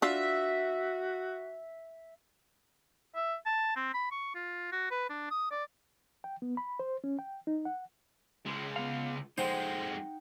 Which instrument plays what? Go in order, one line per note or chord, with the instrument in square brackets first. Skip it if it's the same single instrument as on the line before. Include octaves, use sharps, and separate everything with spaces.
[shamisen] D4 F4 [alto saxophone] F#4 [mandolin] E5
[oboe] E5
A5
C4
B5
C#6
F4
F#4
B4
D4
D#6
D5
[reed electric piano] G5
B3
B5
C5
C#4
G5
D#4
F#5
[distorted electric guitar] C#2 G#3
[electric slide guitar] B3 F5
[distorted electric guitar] F2 G#3 [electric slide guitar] D#4 F#5 G5 [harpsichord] C5